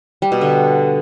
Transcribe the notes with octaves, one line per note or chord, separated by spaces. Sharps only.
G3
B2
D3